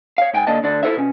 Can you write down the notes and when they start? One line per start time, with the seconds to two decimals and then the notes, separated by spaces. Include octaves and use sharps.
0.18 C#5 F5
0.34 G#2 G5 G#5
0.47 D3 A#3 D5 D#5 A5
0.63 D2 D3 D5
0.83 E4 F4 A4 C5 C#5 E5
0.97 B2 C#4